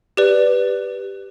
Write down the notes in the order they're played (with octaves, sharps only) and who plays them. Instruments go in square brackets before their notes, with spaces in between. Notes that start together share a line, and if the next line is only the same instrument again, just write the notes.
[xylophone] G4 B4 D5